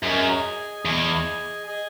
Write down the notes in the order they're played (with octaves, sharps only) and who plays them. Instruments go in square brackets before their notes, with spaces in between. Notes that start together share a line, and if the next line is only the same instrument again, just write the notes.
[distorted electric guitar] F#2 [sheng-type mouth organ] G#4 D#5 G#5
[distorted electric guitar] E2 [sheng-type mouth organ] G#4 D#5 G#5
[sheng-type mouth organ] G#4 D#5 G#5